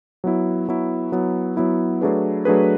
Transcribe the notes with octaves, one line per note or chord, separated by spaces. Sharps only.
F#3 B3 E4
F#3 B3 E4
F#3 B3 E4
F#3 B3 E4
F#3 A3 D4 G#4 B4
F#3 A3 D4 G#4 B4